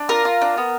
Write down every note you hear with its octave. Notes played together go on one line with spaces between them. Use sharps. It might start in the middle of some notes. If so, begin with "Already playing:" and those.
Already playing: D4
F4 A#4
F4
D4
B3